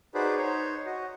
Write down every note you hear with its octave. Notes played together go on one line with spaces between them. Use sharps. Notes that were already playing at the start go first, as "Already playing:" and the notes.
D#4 F#4 G#4 B4 C5 D5
D#4 C5 C#5
F#4 D#5